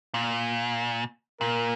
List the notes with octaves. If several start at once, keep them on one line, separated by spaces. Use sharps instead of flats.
A#2
A#2 A#4